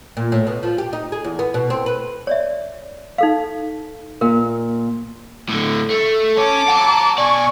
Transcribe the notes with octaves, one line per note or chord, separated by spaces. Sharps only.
A#2
A2
B2
F3
G4
D#4
G#4
E2
B3
B2
C4
B4
C#5 D5 E5
D#4 A4 F5
A#2 A#4
A2 D3
A3
C#4 A5 D6
F#5 A#5
B2 D5 G#5 C#6